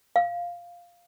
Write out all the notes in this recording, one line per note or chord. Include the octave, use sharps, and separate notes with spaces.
F5